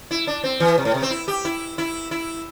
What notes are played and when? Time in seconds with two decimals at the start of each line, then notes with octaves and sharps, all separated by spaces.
0.11 E4
0.27 D4
0.44 C4
0.60 E3
0.78 C3
0.85 A2
0.94 C3
1.02 C4
1.10 E4
1.28 G4
1.45 E4
1.78 E4
2.11 E4